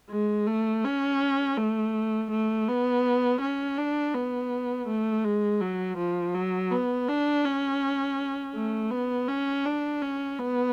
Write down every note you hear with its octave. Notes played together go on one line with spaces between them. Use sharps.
G#3
A3
C#4
A3
A3
B3
C#4
D4
B3
A3
G#3
F#3
F3
F#3
B3
D4
C#4
A3
B3
C#4
D4
C#4
B3